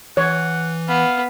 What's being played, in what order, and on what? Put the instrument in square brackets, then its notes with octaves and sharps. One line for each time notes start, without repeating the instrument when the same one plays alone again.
[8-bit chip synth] E3 [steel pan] C#5 [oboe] F#5
[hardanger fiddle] B3 [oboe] F5